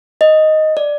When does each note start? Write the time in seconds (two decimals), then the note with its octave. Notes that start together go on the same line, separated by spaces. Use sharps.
0.21 D#5
0.77 D5